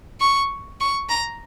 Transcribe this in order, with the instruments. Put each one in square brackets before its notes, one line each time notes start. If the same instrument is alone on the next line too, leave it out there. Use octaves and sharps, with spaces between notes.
[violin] C#6
C#6
A#5